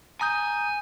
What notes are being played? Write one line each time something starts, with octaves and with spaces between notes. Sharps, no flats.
G#5 A#5 D#6 G6